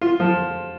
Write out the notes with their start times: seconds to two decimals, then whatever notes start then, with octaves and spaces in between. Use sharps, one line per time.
0.01 F4
0.20 F3